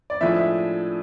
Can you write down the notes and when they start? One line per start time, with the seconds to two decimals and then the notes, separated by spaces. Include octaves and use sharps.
0.10 D5
0.21 A2 F3 G#3 D4 E5
0.39 E5